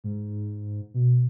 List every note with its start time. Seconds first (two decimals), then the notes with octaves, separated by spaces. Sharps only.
0.04 G#2
0.94 B2